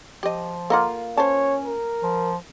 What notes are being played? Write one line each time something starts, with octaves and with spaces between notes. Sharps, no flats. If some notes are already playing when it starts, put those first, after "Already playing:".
F3 G4 D#5
A#3 F4 A4 D#5 F#5
C#4 C5 C#5 A5
A#4
F3